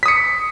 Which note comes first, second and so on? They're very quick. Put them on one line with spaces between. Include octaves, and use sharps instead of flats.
B6 D#6 C#7